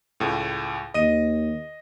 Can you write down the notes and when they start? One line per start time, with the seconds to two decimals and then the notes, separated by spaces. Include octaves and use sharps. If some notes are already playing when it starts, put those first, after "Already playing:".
0.20 C#2 A2
0.94 D#2 D#5 D#7